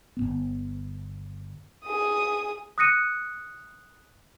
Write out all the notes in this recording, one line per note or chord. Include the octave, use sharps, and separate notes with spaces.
G1 F2 B3
G#4 D#6
D#6 F#6 A#6 C#7 D#7